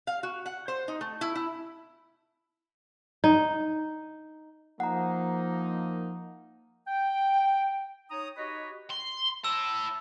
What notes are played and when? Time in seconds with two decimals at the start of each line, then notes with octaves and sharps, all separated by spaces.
0.07 F5
0.23 F#4
0.46 F#5
0.68 C5
0.88 D#4
1.01 A3
1.21 E4
1.35 E4
3.24 D#4
4.80 F3 A#3 D#4 F#5 A#5
6.87 G5
8.10 D#4 C#5 A#5 D#6
8.37 D#4 F#4 G4 B4 C#5 D#5
8.91 C6
9.45 E4 A5 E6